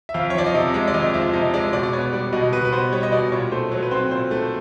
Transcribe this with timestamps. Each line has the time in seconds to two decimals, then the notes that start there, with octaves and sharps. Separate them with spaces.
0.09 E5
0.14 F2 F5
0.30 C#5
0.35 F3 D5
0.46 D#5
0.54 C3 E5
0.74 G#3
0.88 D5
0.94 F2 D#5
1.14 F3 E5
1.33 C3 D#5
1.54 G#3 D5
1.73 B2 D5
1.83 D5
1.93 B3 C#5
2.13 G3 D5
2.33 B2 D#5
2.52 B2 B4
2.65 B4
2.72 B3 C5
2.92 G3 C#5
3.03 D#5
3.12 B2 D5
3.32 A#2 C#5
3.51 A3 C5
3.72 F#3
3.82 B4
3.91 C4 C5
4.11 A#2 C5
4.31 A3